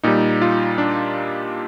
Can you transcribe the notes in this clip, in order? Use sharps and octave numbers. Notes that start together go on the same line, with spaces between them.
A#2 G3 D#4
F4
D4